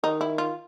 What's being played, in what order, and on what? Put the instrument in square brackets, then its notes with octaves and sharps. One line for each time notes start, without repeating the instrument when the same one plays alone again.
[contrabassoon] D#3 [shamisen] D#4
[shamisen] E4
F4